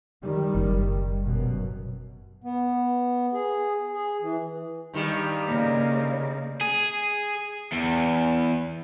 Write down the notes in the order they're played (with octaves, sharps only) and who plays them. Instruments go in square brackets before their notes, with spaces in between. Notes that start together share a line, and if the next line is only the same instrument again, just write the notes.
[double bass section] D#3 G3
[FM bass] F#1
[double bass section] F#2 B2
[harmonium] B3
G#4
G#4
E3
[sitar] G2 D#3 G3
[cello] C#3 A#3
[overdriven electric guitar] G#4
E2